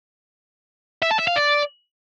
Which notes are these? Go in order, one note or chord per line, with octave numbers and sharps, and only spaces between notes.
E5
A5
E5
F5
D5